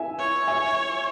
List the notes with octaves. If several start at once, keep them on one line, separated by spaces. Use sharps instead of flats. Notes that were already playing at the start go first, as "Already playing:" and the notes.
Already playing: E5 G#5
C#5
E5 G#5